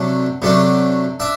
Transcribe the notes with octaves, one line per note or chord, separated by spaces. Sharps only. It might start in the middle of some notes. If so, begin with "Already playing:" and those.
Already playing: C3 F#3 A3 D4
C3 F#3 A3 D4
D4 E5